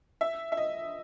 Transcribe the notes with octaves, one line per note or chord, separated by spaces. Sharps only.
E5
E5
D#5